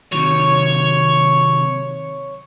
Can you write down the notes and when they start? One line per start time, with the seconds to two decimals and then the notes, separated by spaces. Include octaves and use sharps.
0.12 C3 D#3 F#3 C#5